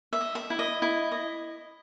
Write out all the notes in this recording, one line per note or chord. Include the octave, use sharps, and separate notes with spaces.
E5
D#5
E5
E4
D#5
E4
D#5